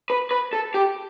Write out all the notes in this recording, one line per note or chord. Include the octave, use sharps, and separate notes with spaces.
B4
B4
A4
G4